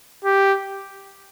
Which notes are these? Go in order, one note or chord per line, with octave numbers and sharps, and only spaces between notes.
G4